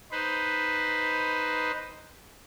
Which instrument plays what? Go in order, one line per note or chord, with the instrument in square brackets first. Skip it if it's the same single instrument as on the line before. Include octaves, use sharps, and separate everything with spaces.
[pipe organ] D#4 B4 C5